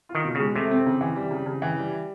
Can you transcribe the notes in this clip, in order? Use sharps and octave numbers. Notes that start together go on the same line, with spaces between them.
F4
D#3
B2
C#3 G#3
C3 A3
C4
C#3
E3
G3
C#3
C#3
E3
G3